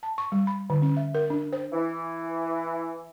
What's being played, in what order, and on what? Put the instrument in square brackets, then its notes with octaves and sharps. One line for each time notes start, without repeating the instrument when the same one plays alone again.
[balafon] A5
C#6
G3
B5
D3
C#4
E5
A#4
D4
C5
[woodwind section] E3